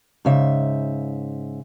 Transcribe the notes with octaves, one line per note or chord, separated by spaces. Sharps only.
G#2 C#3 E5